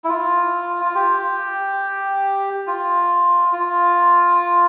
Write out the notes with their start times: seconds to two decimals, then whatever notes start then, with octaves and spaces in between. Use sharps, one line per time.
0.04 E4
0.09 F4
0.85 F4
0.95 G4
2.67 F4
3.53 F4